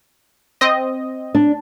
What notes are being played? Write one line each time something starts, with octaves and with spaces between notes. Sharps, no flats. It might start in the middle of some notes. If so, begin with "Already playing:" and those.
C4 D#5
D4